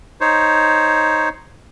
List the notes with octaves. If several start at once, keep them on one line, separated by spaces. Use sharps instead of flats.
D#4 C5 C#5